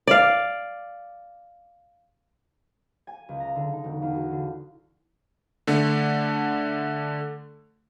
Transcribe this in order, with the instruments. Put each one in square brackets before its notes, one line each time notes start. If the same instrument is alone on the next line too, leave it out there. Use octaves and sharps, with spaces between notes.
[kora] D5 F5
[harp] G#5
C#2
A#5
D3
D#4
E1
E2
F#4
D3
[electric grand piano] D3 A3